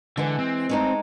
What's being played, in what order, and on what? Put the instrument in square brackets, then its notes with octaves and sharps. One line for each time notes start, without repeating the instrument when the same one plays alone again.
[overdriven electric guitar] D3 [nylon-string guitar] E3 G#3
[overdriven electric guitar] C4
[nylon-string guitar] G#3 A3 D#4